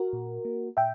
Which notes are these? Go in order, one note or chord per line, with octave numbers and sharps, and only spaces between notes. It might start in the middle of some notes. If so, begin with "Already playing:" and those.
Already playing: F#4 A#4
A#2
A#3
A#2 E5 G5